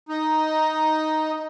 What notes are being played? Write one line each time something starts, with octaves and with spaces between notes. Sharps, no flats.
D#4